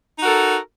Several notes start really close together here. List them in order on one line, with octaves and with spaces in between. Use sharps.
D#4 F#4 A#4 A4